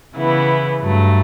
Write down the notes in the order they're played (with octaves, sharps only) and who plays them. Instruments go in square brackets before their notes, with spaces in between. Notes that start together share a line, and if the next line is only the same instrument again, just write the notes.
[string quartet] C#3 E3 B3 E4
G2 F#3 A3